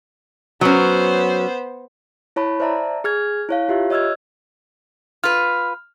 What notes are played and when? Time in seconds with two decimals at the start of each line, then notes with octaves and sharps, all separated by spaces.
0.61 F#3 B3 C#4 C5
2.36 E4 C#5 A5 B5
2.60 C5 D5 E5 A5 A#5
3.04 G#4 F6 G#6
3.49 E4 C#5 F5
3.69 F4 G4 E5
3.90 C#5 D#5 E6 F6 G#6
5.24 F4 B4 F6